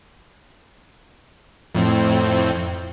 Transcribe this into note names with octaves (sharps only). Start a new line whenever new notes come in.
F2 A2 C4